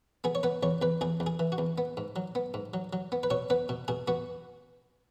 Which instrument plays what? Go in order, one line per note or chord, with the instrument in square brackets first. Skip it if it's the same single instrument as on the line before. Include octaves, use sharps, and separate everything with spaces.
[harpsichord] B3 G#4
C#5
B3 B4
E2 C#5
E2 B4
E2 G#4
E2
G#4
E3
F#4
E2
B3
G#2
F#3
B3
G#2
F#3
F#3
B3
B4
B2 C#5
B3 B4
B2
B2 G#4
B3 F#4